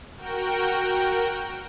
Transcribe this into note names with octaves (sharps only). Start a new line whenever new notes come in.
F#4 A#4 G5